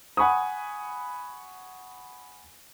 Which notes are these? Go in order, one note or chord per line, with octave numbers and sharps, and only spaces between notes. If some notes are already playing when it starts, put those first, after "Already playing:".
F#5 G#5 B5 C#6 D#6